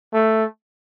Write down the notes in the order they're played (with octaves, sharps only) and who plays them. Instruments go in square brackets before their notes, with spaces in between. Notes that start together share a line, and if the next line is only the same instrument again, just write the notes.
[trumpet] A3